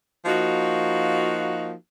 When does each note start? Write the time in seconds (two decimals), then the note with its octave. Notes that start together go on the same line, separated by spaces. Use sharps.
0.25 F3 A#3 D#4 F#4